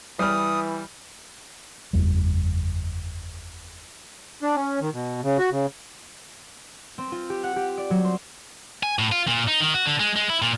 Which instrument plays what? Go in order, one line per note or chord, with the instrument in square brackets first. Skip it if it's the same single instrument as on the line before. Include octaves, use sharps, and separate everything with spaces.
[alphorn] E3 [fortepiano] G3 F6 [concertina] D#6
[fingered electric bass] F#1 E2 G3
[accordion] D4
C#4
D#3
B2
C#3
F#4
C#3
[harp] C4
F4
G4
F#5
G4
D5
F#3
C5
[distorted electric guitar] G#5
A2
F4
A#2
D#4
D#3
F#4
D3
G#3
G#3
E4
A#2